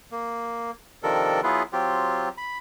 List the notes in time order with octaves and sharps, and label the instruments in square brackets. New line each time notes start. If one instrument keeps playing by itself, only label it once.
[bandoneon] A#3
C3 D#3 F3 D4 A4 A#4
F#3 B3 E4 F4 G#4 B4
F#3 C4 F4 G4
B5